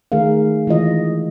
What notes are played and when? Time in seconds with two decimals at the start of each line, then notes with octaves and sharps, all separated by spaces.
0.12 D#3 A3 G#4 A#4 F5
0.67 E3 G#3 E4 F4 D#5